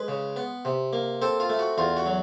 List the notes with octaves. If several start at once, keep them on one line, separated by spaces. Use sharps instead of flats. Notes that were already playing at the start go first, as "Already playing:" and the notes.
Already playing: G#3 B4
C#3
B3
C3
A#3
C4 A4
F4
A3
F#4
E2 F4
F#4
F#3